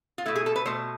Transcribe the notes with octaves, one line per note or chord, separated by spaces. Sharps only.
F4
B2 A3 E4
G#4
A4
B4
B2 A3 C5